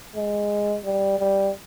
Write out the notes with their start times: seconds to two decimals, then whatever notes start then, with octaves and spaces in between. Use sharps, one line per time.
0.16 G#3
0.85 G3
1.19 G3